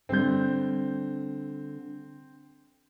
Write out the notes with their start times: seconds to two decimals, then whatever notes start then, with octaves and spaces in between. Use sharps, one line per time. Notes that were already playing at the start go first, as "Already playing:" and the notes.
0.09 D3 G3 C4 G6